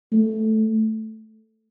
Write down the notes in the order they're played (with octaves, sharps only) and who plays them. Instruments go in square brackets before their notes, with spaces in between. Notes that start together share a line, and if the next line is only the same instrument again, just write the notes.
[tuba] A3